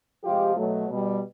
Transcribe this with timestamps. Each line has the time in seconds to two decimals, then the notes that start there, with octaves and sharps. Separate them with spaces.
0.24 C3 F3 G#3 F4 G4
0.57 B2 F#3 A3
0.88 B2 G3